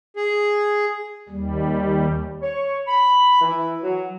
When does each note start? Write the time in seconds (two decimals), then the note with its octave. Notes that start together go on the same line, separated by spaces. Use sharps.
0.17 G#4
1.29 D#2 G3
2.42 C#5
2.88 B5
3.41 E3
3.82 F#3